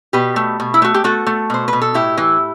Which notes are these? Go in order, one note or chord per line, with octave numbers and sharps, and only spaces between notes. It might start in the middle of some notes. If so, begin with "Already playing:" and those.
B2 G4 B4
A3
B2
E4
A3 F#4
G4
A3 F#4 A4
A3
B2 C5
B4
B2
A4
A2 E4 G4
E3